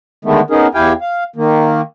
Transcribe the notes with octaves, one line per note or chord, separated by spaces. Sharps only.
D3 D#3 G#3 A3 B3
B3 C#4 D#4 G#4 A#4
E2 E4 G4 F5 G5 G#5
F5
D#3 A#3